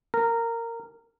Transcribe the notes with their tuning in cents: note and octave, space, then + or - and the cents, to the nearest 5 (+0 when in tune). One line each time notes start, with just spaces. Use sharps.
A#4 -15